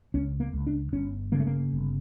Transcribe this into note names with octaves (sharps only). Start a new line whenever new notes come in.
C#2 C#4
A#3
C#2
D4
G1 C#4
C#3 A#3
A3
A#3
G1